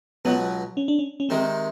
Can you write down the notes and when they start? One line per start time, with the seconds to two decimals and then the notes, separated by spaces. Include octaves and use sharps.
0.25 C#2 B2 F#3 B3
0.77 C#4
0.88 D4
0.99 C#4
1.20 C#4
1.29 C3 D#3 G#3 C4